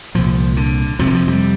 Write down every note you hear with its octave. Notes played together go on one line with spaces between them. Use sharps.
C2 A#2 F3
D3
F2 C3 F3
D3
F3
G3